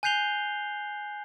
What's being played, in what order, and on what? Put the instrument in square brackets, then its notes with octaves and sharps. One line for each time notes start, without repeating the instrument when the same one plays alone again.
[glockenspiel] G#5 F#6 G6 C7 F7 G7